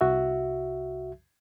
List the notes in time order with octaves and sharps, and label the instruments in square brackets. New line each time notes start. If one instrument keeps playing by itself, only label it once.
[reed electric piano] C2 F#4 E5